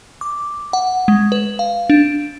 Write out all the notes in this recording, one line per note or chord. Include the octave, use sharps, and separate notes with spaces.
D6
F#5
G#3
B4
F5
D4